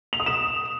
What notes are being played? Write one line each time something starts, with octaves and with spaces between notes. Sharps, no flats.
F7
D#6
E7